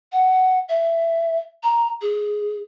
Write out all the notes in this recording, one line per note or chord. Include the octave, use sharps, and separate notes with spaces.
F#5
E5
A#5
G#4